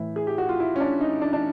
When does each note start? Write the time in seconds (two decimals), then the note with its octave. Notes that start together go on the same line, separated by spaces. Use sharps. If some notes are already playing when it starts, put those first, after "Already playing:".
Already playing: A2 E3 E4
0.16 G#4
0.27 G4
0.38 F#4
0.49 F4
0.60 E4
0.76 C#4
0.80 D4
1.01 D#4
1.21 D4
1.33 D4